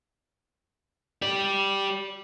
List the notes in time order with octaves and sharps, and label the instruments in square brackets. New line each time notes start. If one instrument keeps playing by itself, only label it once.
[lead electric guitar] G4 D5